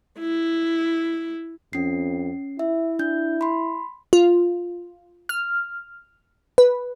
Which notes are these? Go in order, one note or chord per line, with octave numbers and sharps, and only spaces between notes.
E4
F2 C#4 C7
E4 E5
D4 G6
B5 C6
F4
F6
B4